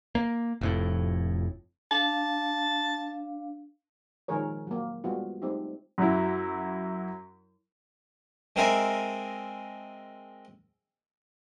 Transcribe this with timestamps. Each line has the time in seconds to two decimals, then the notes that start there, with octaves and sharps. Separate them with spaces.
0.15 A#3
0.61 F1 F2 A2
1.91 D4 F5 A5
4.28 D#3 F3 G#3 G#4 A#4 C#5
4.67 F#3 A#3
5.04 G3 G#3 B3 F4 F#4
5.42 G3 A3 C4 D#4 G4
5.98 F#2 F#3 E4
8.56 G#3 C4 A#4 E5 G#5